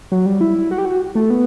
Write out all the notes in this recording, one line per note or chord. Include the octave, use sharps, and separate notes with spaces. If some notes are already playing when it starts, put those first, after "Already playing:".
F#3
G3
E4
F#4
G4
F#4
A3
B3